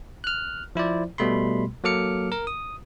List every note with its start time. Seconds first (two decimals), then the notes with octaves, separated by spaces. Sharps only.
0.24 F6 F#6
0.75 F3 E4 C5 D5
1.18 B2 G3 A3 B5 C6
1.84 F#3 A#3 A4 D6 F6 C#7
2.32 A#4
2.47 D#6